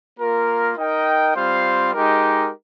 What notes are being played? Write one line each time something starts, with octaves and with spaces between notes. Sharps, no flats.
A#3 F4 A#4
D#4 A#4 D#5 G5
G3 C4 F4 C5 F5
G#3 D#4 G4 A#4